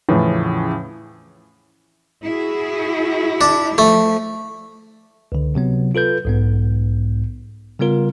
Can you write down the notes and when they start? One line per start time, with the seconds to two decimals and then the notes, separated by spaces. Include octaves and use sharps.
0.09 E2 A2 C#3 E3 F3 C#4
2.22 E4 F#4 G#4
3.41 D4
3.78 F3 A3
5.32 C#2 D3
5.55 C3 F#3 B3
5.95 F4 A4 B4 G6
6.25 B1 G#2 B3
7.79 C#3 G3 B3 F4 A#4